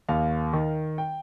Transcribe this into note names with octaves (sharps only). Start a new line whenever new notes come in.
D#2 F5
D#3
G5